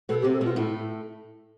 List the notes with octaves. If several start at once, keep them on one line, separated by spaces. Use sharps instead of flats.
B2 B3 A4
G4
C3 C4
A4
B2 B3 F4
A2 A3 E4